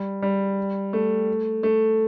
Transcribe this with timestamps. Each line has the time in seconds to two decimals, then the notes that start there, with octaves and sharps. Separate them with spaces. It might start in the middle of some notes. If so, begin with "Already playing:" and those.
Already playing: G3
0.22 G3
0.93 A3
1.63 A3